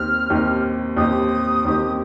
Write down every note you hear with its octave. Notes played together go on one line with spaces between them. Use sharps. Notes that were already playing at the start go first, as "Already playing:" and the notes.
Already playing: D#2 D#3 C4 G4 F6
D#2 D#3 C4 G4
D#2 D#3 C4 G4 D#6
D#2 D#3 C4 G4